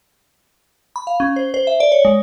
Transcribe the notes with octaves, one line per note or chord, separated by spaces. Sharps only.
B5
F5
C#4
C5
C5
E5
D5
C#5
G#3